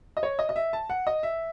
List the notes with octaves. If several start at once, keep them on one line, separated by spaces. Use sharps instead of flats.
D#5
C#5
D#5
D#5
E5
A5
F#5
D#5
E5